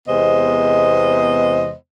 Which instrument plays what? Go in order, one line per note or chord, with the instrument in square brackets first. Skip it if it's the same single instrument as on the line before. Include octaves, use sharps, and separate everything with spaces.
[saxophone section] E2 C3 G#3 B3 C5 D#5